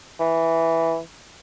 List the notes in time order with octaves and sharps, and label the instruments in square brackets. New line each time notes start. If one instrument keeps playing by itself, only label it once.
[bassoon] E3